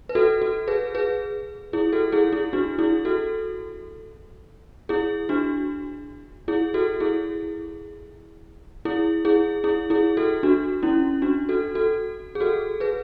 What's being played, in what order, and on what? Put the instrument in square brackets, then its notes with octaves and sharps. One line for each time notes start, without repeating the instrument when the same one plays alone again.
[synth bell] B4
F#4 A4
F#4 A4
G#4 B4
G#4 B4
E4 G#4
F#4 A4
E4 G#4
E4 G#4
D4 F#4
E4 G#4
F#4 A4
E4 G#4
D4 F#4
E4 G#4
F#4 A4
E4 G#4
E4 G#4
E4 G#4
E4 G#4
E4 G#4
F#4 A4
D4 F#4
C#4 E4
D4 F#4
F#4 A4
F#4 A4
G#4
F#4 A4
G#4 B4